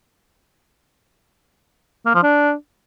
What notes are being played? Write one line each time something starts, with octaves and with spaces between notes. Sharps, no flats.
A#3
F3
D4